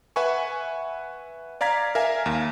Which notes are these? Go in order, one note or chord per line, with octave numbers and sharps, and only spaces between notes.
B4 E5 F#5 G#5 C#6
D5 F5 A#5 G#6 B6
A#4 E5 F5 G#5
D#2